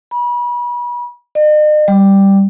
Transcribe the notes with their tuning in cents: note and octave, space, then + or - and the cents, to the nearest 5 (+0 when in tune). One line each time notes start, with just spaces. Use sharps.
B5 -35
D#5 -45
G3 +0